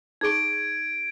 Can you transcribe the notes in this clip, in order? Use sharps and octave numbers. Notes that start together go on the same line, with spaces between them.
D#4 G#4 C#6 G#6 D7